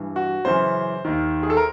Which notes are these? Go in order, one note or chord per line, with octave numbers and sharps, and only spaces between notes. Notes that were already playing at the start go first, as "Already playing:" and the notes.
Already playing: G2 E3
F#4
F#2 C#3 E3 C5
D#2 D#3
G#4
A4
A#4